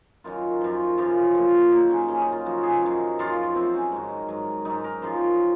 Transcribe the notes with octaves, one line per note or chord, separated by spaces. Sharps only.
F#2 D#3 F#3 F4
F#2 F3
F#2 C#3 F3
A#2 F3
A#2 F#3 D#4
C#4
F#2 C#3 F#3 C#4
D#4
F4
F#2 C#3 F3 F#4
G#4
F#2 D#3 F#3
F#2 F3 F4
C3 F#3 C4
C#4
G#2 D#3 F#3
G#2 F#3
G#2 F#3 D#4
A#4
F#2 F3